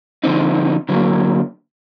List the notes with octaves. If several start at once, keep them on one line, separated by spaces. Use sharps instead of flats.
D3 F3 G#3 C4 D#4
D3 F#3 A#3